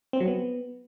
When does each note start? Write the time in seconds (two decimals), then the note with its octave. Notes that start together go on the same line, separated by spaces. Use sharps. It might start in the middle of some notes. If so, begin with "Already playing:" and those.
0.13 C4
0.20 F#3
0.28 B3